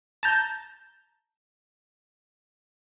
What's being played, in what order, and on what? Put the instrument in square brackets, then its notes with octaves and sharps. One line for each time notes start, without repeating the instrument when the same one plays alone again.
[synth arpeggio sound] A5 A#5 G6